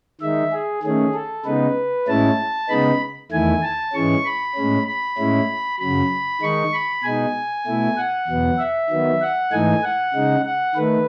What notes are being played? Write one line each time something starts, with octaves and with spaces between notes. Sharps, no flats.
D#3 G#3 D#4 E5
G#4
D#3 A3 C#4 G#4
A4
C#3 G#3 B3 D#4 B4
A2 G#3 C#4 E4 A5
C#3 G#3 B3 D#4 B5
E2 D#3 A3 E4 G#5
A5
G#2 E3 G#3 C#4 C#6
B5
A2 G#3 C#4
B5
A2 G#3 C#4 E4
F#2 C#3 F#3 B5
D#3 G#3 D#4 C#6
B5
B2 G#3 D#4 G#5
B2 A3 E4
F#5
E2 B2 F#3 B3
E5
D#3 F#3 B3
F#5
G#2 E3 A3 D#4 G#5
F#5
C#3 G#3 D#4
F#5
D#3 A3 B4